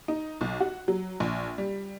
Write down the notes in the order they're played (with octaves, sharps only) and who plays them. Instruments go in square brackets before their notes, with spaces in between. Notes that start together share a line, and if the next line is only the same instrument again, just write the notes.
[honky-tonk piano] D#4
B1
F#4
F#3
A#1
G3